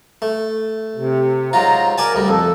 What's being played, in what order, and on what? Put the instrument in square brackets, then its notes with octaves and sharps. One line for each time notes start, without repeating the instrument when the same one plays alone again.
[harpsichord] A3
[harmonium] C3
[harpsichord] G#2 F#3 F4 [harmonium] A#5
[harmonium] A#4 [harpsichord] D5 G#5 A5
[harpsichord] D2 G3
[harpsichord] F2 [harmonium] A4